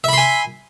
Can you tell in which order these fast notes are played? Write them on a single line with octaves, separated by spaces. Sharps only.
E5 B5 C6 G#5